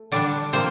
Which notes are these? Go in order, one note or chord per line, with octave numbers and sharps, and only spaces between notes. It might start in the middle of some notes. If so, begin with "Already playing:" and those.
Already playing: A3
D3 G3 D4 D5
C3 F3 A#3 C5